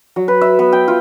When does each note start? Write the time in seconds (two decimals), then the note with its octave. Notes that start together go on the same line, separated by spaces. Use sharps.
0.16 F#3
0.28 B4
0.41 E5
0.59 B3
0.72 G5
0.88 F4